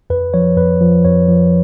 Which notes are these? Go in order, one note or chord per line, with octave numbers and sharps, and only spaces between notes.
F2 B4
F3 C#5
F2 B4
F3
F2 C#5
F3